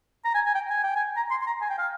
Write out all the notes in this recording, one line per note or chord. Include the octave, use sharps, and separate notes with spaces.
A#5
G#5
G#5
G5
G#5
G5
G#5
A#5
C6
C6
A#5
G#5
G5
F5